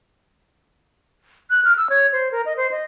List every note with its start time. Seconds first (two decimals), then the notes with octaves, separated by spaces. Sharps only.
1.50 F#6
1.65 F6
1.78 E6
1.90 C#5
2.12 C5
2.31 A#4
2.46 D#5
2.57 C5
2.71 D#5